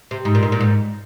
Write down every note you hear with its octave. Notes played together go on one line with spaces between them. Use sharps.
C3
G#2
A#2
G#2
A#2
G#2